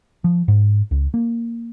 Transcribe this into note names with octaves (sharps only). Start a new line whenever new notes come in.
F3
G#2
C#2
A#3